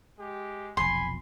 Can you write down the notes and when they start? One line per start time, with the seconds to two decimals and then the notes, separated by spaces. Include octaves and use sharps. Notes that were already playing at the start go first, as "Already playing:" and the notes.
0.18 G#3 G4
0.77 F1 B1 F2 G#5 B5 C6